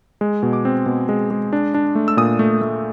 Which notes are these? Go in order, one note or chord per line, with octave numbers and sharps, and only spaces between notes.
G#3
B2
D6
C4
B2
G#3
G#3
D4
D4
A3
E6
A#2 D#6
A3
A3